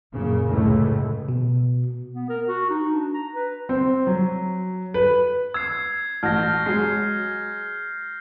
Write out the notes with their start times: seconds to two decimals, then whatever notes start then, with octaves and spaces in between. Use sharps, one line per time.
0.13 F#2 A#2 C#3
0.47 C#2 A2
1.29 B2
2.14 B3
2.29 A#4
2.47 F#4
2.70 D#4
2.92 D4
3.14 A#5
3.34 B4
3.69 C4
4.07 F#3
4.94 B4
5.54 E6 G#6 C7
6.23 A1 F#4 F6 G6 A#6
6.66 F#3 G#3 C7